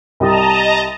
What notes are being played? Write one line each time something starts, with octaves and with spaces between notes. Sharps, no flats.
C2 G3 D#5 A5 A#5 D#6